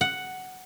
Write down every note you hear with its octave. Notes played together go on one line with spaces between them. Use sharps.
F#5